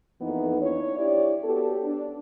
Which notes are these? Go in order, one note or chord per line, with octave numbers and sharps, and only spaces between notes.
F2 E3 A#3 B3 D#4
D4 E4 C#5
D4 E4 G4 C#5 D5
B3 F#4 G4 A4
D4